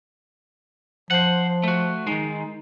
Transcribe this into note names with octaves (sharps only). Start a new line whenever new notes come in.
F3 C5 F#5
A3 F#4
D#3 G#3 D#4